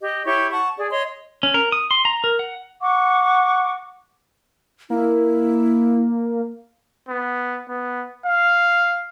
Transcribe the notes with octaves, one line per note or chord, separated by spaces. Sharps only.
G4 D#5
E4 G4 C#5 C#6
F#5 A5 C#6
G#4 D5
C#5 D#5 C6
C#4
A#4
D#6
C6
A#5
A#4
F#5
F#5 C#6 D6
A#3 E4
B3
B3
F5